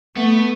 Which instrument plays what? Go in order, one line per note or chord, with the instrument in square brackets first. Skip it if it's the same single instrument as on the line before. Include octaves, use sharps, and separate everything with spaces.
[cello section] A3 [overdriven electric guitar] B3